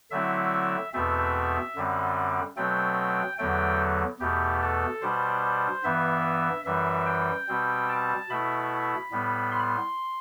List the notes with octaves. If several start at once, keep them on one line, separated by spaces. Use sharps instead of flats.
D3 F#3 A3 C4 E4 E5
E2 B2 A3 C4 E5
F#2 D3 G3 C4
B2 F#3 A3 C4 G5
E2 D3 F#3 A3 G5
E2 B2 A3 G4
A4
B2 G3 D4 C5
G2 E3 B3 E5
F#2 E3 G3 E5
G5
B2 G3 C4
A5
B2 A3 E4 B5
A2 G3 B3
C6